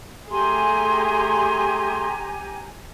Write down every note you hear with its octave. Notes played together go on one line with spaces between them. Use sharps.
A3 G4 G#4 G#5 A#5 C6